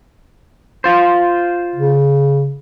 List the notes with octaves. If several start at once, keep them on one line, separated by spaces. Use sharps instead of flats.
F4 C5
C#3